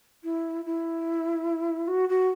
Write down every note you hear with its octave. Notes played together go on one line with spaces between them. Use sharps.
E4
E4
F#4
F#4